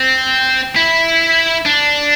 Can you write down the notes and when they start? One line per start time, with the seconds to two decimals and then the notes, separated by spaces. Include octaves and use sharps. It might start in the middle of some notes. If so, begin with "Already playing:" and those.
Already playing: C4
0.76 E4
1.66 D4